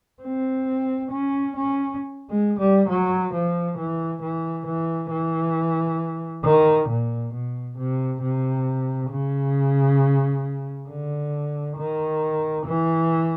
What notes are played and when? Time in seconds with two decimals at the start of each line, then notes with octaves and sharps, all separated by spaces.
0.22 C4
1.11 C#4
1.56 C#4
2.30 G#3
2.59 G3
2.89 F#3
3.33 F3
3.78 E3
4.22 E3
4.66 E3
5.11 E3
6.44 D#3
6.89 A#2
7.33 B2
7.78 C3
8.22 C3
9.11 C#3
10.89 D3
11.78 D#3
12.66 E3